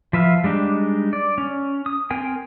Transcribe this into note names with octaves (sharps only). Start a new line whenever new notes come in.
F3 B4 E5 F5
G3 G#3 D4 D#4
D5
C#4
D#6
C4 A#4 G5 G#5